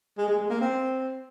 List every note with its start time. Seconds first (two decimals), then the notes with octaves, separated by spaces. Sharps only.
0.18 G#3
0.28 G#3
0.39 G#3
0.50 A#3
0.61 C4